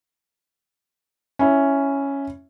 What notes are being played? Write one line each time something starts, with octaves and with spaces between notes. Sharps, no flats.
C#4 E4